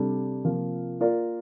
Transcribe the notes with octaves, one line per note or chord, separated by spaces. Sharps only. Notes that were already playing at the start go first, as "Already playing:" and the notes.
Already playing: C3 G3 D4 A4
C3 F3 A#3 F4
A#3 F4 A#4 D5